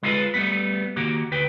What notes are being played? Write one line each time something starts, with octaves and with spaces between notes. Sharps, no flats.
G#3 E4 F4 A4 B4
G3 A3 B3 B4
D#3 A#3 F#4 G4
D2 B4 G5